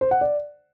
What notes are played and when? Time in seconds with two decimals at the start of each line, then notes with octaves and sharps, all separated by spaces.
0.01 C5
0.11 F#5
0.21 D5